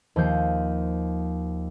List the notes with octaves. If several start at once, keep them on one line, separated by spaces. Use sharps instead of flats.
D#2 F3 C5 G6